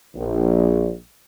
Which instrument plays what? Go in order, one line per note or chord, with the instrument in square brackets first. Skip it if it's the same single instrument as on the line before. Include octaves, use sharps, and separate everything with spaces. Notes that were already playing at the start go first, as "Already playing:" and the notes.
[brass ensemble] A#1